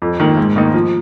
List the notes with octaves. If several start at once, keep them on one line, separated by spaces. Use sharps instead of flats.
F2
D#3 A#3
G#2
D#3 A#3 D#4
F3